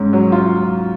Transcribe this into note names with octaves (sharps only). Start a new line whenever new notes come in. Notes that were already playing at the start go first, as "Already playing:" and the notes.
Already playing: G#2 C#4
F#3
F4